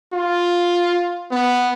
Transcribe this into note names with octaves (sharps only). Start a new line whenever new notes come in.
F4
B3